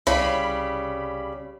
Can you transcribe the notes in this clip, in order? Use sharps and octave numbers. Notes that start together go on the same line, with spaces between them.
C2 C#3 G3 B5